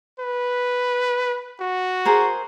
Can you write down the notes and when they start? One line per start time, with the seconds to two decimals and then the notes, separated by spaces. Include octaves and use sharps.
0.19 B4
1.60 F#4
2.05 G#4 A#4 C5